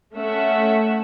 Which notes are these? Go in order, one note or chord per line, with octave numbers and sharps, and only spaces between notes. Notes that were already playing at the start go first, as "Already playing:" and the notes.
A3 C#4 E5 F#5